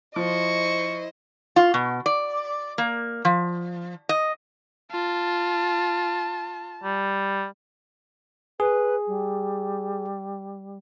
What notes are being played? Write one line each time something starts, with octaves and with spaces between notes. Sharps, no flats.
F3 E4 C5 D#5 C#6
F4
B2
D5
A#3
F3
D#5
F4 A5
G3
G#4 B4
G3